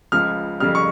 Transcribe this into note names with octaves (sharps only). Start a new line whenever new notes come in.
C#2 C#3 F3 F6
F2 C#3 G3 F6
C#6